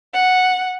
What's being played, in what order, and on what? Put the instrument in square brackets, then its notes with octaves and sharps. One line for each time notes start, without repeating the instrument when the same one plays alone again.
[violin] F#5